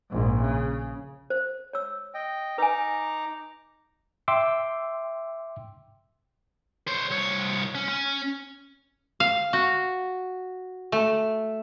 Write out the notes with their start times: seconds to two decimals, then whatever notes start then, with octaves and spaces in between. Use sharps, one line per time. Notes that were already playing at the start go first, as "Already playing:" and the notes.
0.11 A#1 G#2
0.40 C#3
1.30 C5
1.73 C#5 E6
2.14 D#5 G5
2.58 D#4 B4 G#5 A#5 D6
4.28 E5 G5 C6 D6 E6
6.88 C5 C#5
7.11 C2 C#5
7.75 C#4
7.88 C#4
9.20 F5
9.53 F#4
10.92 A3